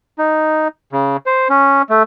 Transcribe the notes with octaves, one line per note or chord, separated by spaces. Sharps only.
D#4
C#3
C5
C#4
A3